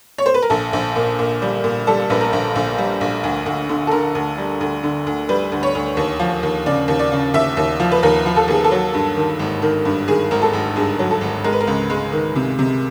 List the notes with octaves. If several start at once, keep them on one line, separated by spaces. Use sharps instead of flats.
C#5
C5
B4
A#4
A#1 A4
A#1
A#2
A#2
G3
A#2
G3 A4
A#1 B4
A#4
A#1
A#1
G3
A#1
D2
D2
D3
A4
D3 A#4
D2
G3
D2
D3
D2
G3 B4
D2
C#5
D2
D#2
F3
D#2
C#3 D5
D#2
D5
C#3
D#2 E5
D#2
F3
B4
D#2 A#4
F3
A4
D#2 G#4
A4
F#3
G2
D#3
G#1
D#3
G2
D#3 G#4
G#1 A#4
A4
G#1
G2 G#4
F#3
A4
G#1
G#3 A#4
B4
A#4
C#2
G#3
D#3
C3
C3